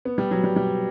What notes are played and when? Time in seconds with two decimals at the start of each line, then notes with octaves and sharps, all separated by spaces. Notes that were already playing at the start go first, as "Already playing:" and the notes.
0.05 B3
0.18 G3
0.31 F#3
0.44 G3
0.56 G3